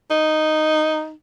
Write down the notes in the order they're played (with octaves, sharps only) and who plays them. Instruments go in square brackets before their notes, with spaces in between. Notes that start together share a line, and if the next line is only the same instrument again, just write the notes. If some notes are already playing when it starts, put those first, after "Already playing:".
[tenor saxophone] D#4